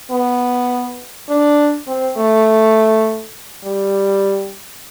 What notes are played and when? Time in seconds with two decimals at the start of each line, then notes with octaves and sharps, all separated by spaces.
0.11 B3
1.28 D4
1.87 C4
2.17 A3
3.64 G3